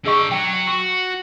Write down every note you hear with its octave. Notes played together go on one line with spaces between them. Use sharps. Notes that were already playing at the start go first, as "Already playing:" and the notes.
D3 G4 G#4 D#5 C#6
F#3 C#5 G5
F#4 C#6 F#7